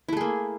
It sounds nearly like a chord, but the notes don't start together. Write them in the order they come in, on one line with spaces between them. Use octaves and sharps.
E4 A3 G#4 A#3